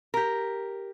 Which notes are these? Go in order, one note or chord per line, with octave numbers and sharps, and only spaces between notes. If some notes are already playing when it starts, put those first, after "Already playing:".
G4 A#4